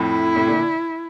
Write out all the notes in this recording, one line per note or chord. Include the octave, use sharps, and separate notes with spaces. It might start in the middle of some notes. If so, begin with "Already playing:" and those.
Already playing: F2 A2 E4
A2 C3
A#2 D3